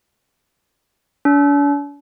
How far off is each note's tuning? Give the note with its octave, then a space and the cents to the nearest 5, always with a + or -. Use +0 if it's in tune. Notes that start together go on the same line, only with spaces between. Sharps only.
D4 -45